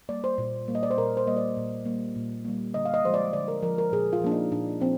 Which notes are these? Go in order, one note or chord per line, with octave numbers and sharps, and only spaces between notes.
G3 A#3 D5
C5
A#2
G3 A#3
D#5
D5
C5
A#2 A#4
C5
G3 A#3 D#5
D5
A#2
G3 A#3
A#2
G3 A#3
D3 D#5
F5
D#5
F3 G#3 C5
D5
D3 D5
A#4
F3 G#3 A#4
A#4
A#2 G#4
F4
F3 A#3 D4
D#4
A#2 D4
F3 C4